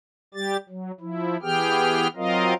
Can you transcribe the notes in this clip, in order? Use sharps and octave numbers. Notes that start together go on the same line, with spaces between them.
G3 G4 A6
F#3
F3 E4
E3 B3 G4 G#4 G5 F6
F#3 C4 F4 A#4 D#5 F5